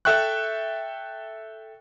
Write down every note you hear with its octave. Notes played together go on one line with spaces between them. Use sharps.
A4 E5 G5 C#6 F#6